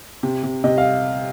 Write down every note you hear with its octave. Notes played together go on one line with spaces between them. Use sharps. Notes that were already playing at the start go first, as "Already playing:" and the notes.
C3
C3
C3 D#5
F5